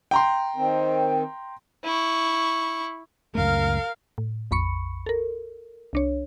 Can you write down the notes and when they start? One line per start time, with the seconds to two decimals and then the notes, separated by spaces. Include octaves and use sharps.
0.11 G5 A#5 C6
0.56 D#3 C4
1.84 E4 C#6
3.35 C#2 F#2 A3 A#4 F5
4.18 A2
4.51 A#1 F2 B5 C#6 C#7
5.06 A4 A#4
5.93 C2 D4 C#5